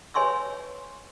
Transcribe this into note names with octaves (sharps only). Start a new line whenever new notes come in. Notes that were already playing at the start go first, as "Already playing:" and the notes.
B4 C#5 G#5 C6 C#6 E6